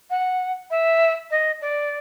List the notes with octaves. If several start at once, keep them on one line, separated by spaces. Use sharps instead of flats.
F#5
E5
D#5
D5